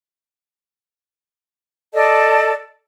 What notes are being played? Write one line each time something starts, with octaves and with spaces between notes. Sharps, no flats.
A4 D5 D#5 A5